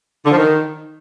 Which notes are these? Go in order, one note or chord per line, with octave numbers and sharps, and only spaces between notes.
D3
F3
D#3